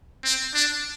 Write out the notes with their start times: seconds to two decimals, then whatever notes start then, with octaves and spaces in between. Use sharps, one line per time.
0.25 C4
0.54 D4